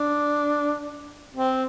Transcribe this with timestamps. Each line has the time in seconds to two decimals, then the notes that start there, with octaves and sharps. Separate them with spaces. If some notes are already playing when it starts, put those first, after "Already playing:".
Already playing: D4
1.35 C4